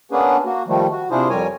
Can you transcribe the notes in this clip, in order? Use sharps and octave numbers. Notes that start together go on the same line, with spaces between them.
A#3 B3 C#4 D4 G#4 B4
A#3 F#4
D#3 F3 G3 A3
F#4
C3 D4 E4 F4 G#4 C5
F2 G3 A#4 C#5 G#5